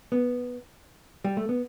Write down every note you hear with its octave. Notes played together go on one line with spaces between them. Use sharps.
B3
G3
A3
B3